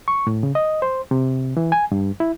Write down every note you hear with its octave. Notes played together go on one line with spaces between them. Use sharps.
C#6
A2
C#3
D#5
C5
C3
E3
G#5
G2
E4